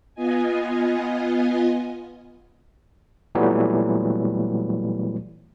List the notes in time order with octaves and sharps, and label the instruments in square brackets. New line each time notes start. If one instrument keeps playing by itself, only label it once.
[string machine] B3 F4 D#5 G#5
[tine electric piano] A#2 E3 F#3 G3 A3 B3